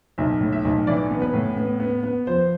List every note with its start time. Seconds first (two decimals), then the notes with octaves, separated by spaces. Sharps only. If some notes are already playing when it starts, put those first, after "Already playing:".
0.18 B1 E5
0.41 A2
0.52 E5
0.65 B1
0.87 E3 D5
1.10 B3
1.22 B4
1.34 A2
1.57 B3
1.80 B3
2.03 B3
2.27 F3 C5